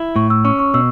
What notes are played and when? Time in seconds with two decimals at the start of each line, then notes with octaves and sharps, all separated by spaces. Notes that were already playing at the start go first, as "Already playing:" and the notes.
Already playing: E4
0.16 A2 C#6
0.30 E6
0.45 C#4 C#6
0.59 C#6
0.74 B2 E6